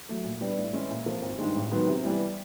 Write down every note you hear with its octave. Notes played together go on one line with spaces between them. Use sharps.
F#3 A3
A#2
G3 B3 D4
A2
E3 G#3 C#4 E4
A#2
F3 A#3
G#1
G2 D#3 G#3
A1
G#2 D#3 F#3 B3
C3
E3 G3 B3